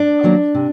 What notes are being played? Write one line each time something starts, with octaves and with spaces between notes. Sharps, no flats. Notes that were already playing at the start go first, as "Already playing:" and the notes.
Already playing: D4
D#3 F#3 A#3
C3